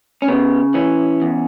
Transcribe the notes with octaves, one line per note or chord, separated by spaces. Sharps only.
C#4
C#3 B3
E3 C#4
E2